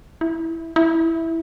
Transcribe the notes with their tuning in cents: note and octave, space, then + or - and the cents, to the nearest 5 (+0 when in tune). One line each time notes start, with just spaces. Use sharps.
E4 -5
E4 -5